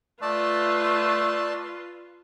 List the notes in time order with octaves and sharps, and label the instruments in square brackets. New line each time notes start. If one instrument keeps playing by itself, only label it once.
[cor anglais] A3 [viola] F4 B4 [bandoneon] D5 A5